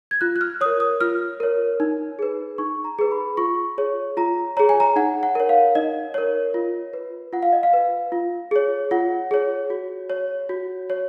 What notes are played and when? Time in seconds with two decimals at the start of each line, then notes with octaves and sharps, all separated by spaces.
0.11 G#6
0.21 F4 F#6
0.36 F#6
0.41 F6
0.61 A#4 C#5 D#6
0.80 D#6
1.01 F4 F6
1.40 A#4 C#5
1.80 D#4
2.19 G#4 B4
2.58 D#4 C#6
2.84 A#5
2.99 G#4 B4
3.12 B5
3.37 F4 C#6
3.78 G#4 C#5
4.17 F4 A#5
4.57 G#4 C#5 A#5
4.69 G#5
4.80 A#5
4.96 D#4 F#5
5.23 F#5
5.35 A#4 C#5
5.49 F5
5.75 D#4 D#5
6.14 A#4 C#5
6.54 F4
6.93 B4
7.33 F4 F#5
7.43 F5
7.53 D#5
7.63 F5
7.73 B4
8.12 F4
8.51 G#4 C#5
8.91 F4 F#5
9.31 G#4 C#5
9.70 F#4
10.10 C#5
10.49 F#4
10.90 C#5